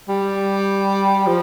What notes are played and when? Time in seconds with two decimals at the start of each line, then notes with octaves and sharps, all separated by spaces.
0.08 G3
1.26 F3